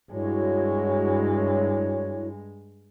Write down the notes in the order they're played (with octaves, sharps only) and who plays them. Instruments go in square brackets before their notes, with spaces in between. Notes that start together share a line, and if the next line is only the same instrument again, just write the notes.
[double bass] G2 G#3 [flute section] E4 F#4 C#5